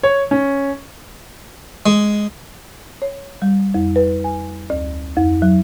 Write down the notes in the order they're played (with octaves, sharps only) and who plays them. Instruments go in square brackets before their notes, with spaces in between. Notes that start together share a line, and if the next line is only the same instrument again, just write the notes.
[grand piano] C#5
C#4
[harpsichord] G#3
[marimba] C#5
G3
F2
B4
G#5
D2
F2
F#3